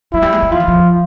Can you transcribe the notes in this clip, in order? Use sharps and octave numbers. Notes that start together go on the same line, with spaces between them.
F#3 E4
G3
G#3
G3
F3 F4
E3
F3